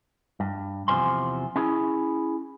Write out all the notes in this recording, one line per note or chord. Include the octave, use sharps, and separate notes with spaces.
G2
E2 C3 F3 C5 G#5 C6
C#4 E4 G#4